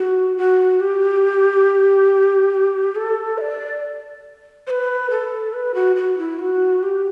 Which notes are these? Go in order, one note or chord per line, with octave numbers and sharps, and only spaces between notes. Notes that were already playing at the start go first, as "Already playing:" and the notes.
Already playing: F#4
F#4
G4
A4
E5
D5
C5
B4
A4
B4
F#4
F#4
E4
F#4
G4